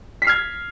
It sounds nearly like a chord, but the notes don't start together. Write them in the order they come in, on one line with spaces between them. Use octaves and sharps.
B6 C7 F6 G#6